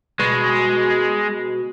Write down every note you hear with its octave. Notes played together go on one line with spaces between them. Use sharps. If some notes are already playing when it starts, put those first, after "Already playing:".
B2 G#3